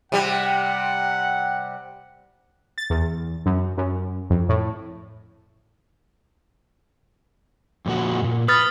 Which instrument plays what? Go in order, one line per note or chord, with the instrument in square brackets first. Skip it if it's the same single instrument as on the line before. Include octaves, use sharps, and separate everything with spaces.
[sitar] C3 G3 [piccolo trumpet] F#5
[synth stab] A6
E2
F#2
F#2
F2
A2
[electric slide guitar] F2 A#2 F#4
G2 A#2
[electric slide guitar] B4 [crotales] D#6 F6 A6